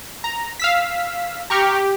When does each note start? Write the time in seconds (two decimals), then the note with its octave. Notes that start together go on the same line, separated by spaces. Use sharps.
0.24 A#5
0.59 F5 E6 B6
1.50 G4 A#5 C#6 F6